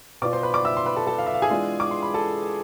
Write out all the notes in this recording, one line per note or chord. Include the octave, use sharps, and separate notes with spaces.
B2 B3 F4 D5 D6
C5 C6
B4 B5
D5 D6
E5 E6
C6
B4 B5
A4 A5
A4 A5
F5
E5
F5
G#4 G#5
E3 G#3 B3 D4 F4
D6
C6
B5
A4 A5